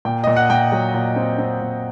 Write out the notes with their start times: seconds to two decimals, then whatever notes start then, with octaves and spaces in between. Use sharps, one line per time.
0.05 A#2 G5
0.24 A#2 D#5
0.36 F#5
0.50 A#2 G5
0.72 F#3
0.94 A#2
1.16 C4
1.39 C4
1.61 A#2